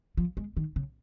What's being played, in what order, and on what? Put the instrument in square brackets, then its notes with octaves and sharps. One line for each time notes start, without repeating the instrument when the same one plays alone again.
[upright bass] F3
G#3
D#3
C#3